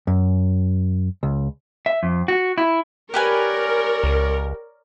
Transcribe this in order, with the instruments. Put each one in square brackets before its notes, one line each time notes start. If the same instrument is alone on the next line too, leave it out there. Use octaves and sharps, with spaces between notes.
[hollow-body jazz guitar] F#2
C#2
[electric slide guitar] E5
F2
F#4
E4
[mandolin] G4 B4 G#5 [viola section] A#4 [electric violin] C#5 D5
[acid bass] C#2